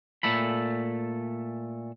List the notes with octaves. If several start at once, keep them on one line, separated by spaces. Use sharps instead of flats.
A#2 A3 A4 B5